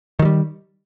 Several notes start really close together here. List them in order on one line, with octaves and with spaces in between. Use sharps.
D#3 F#3 G3